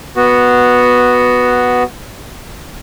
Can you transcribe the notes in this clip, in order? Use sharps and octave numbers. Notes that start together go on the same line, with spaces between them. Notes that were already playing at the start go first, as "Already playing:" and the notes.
B3 F#4